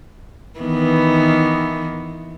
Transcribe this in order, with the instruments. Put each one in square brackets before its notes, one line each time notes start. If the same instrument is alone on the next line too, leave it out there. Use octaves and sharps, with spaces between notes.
[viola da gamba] D#3 E3 B3